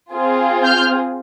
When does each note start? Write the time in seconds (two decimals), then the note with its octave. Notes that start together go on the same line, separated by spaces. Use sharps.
0.15 C4 F4 G#4
0.64 F6 G6